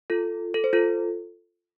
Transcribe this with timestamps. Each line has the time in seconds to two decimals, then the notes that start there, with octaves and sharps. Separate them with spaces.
0.10 F4 A4
0.54 A4
0.64 C5
0.73 F4 A4